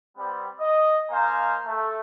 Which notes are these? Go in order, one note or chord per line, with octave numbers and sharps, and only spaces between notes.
G3 B3 C4
D#5
A#3 D#4 C5 F5 G#5 A#5
A3